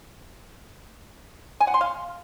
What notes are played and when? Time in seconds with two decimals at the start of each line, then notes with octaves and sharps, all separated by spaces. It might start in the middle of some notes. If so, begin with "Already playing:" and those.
1.60 G#5
1.67 F#5
1.74 C6
1.81 F5